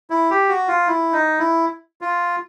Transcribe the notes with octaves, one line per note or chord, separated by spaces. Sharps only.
E4
G4
F#4
F4
E4
D#4
E4
F4